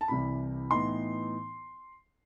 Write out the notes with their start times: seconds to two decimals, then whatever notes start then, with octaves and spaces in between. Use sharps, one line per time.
0.01 A5
0.08 C2 C3 E3 B5
0.71 A2 E3 B3 D#4 C6